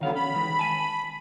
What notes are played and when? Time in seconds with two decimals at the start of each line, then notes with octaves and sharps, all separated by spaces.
0.01 D3 D#3 F#3 B3 F5
0.16 C#4 B5
0.34 D#3 E3 G#3
0.59 G#5 A5